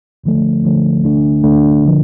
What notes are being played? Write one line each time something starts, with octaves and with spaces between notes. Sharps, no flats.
D2 D3 F3 A3
D2 D3 F3 A3
D2 D3 A3 D4
D2 D3 A3 D4
D3 F3